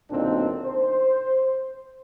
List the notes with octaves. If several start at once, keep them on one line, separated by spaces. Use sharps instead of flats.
B1 A#2 D3 C4 D4 D#4
C5